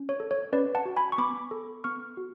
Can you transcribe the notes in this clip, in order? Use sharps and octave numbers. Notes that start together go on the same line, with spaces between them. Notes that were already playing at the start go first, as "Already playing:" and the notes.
Already playing: C#4
C#5
A4
C#5
C#4 B4 D5
F#5 A5
F#4
G#5 B5
C#6
B3 B5 D6
A4
B3 C#6 F6
F#4